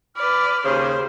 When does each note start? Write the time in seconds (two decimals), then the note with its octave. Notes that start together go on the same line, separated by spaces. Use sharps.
0.17 B4 D5 B5 F6
0.65 D#2 C#3 C5